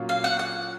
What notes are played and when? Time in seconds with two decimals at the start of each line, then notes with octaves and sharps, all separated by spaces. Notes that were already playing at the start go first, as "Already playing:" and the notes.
Already playing: A#2 F#3 A#3 C#4 F4
0.09 F5
0.24 F#5
0.39 F#5